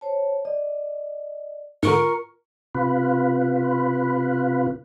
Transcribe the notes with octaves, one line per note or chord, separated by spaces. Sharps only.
C5 C#5 A5
D5 D#5
G#2 D3 F4 A#4 A#5 C#6 C#7
C3 F4 B4